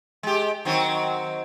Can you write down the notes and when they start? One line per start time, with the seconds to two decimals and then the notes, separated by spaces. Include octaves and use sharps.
0.23 G#3 G4
0.65 D#3 F#3 C4